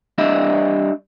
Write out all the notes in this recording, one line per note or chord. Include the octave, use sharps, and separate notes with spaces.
G3 D4 D#5 E5